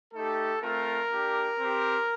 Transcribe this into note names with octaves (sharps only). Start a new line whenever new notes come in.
A3 D#4 G4 A4
A3 C4 F4 A#4
A#3 D4 G4
C4 G4